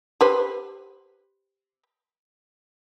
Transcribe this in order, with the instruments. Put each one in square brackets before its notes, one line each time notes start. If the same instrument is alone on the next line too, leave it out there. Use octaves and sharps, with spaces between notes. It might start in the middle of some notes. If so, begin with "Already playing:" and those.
[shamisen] G4 B4 C5